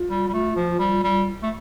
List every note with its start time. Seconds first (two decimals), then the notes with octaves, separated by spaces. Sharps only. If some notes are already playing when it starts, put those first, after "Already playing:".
Already playing: F4
0.10 G3
0.28 G3
0.33 A3
0.56 F3
0.79 G3
1.03 G3
1.43 A3